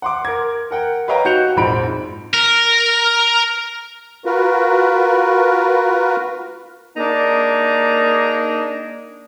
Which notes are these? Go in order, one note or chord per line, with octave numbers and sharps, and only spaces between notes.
F#5 C6 D6
A#4 G#6
A#4 F#5 G5
B4 C#5 D#5 F5 G5 A#5
D#4 F#4 G6 C#7 F7
A#1 F2 G#2 F3 B5 D7
A#4
F4 F#4 A#4 B4
A#3 D4 D#4 G#4